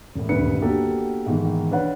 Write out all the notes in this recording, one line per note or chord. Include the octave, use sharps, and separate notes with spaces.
E1 A2
D#1 D2 G2 B4 C#7
A#3 B3 D4 F#4 G4 A4
G#2 B2 D#3 E3
C#4 D4 B4 F#5